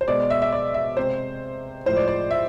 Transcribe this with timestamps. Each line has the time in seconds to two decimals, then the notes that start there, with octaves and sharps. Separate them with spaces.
0.01 C5
0.08 B2 G#3 D5
0.30 E5
0.42 E5
0.52 D5
0.74 E5
0.97 C3 G#3 C5
1.86 A2 F3 G#3 C5
1.97 D5
2.08 D5
2.31 E5